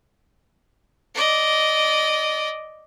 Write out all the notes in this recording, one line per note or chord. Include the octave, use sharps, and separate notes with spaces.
D5 D#5